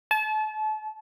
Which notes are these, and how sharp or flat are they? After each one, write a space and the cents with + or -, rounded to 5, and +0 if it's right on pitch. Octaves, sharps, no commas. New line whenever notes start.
A5 -35